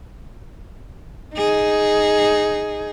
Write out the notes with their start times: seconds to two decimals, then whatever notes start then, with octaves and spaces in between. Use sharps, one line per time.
1.36 D#4 G#4